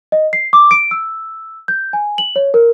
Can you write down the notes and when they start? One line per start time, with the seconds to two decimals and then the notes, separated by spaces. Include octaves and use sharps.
0.12 D#5
0.33 C7
0.53 D6
0.71 D7
0.91 E6
1.68 G6
1.93 G#5
2.18 F#7
2.36 C#5
2.54 A#4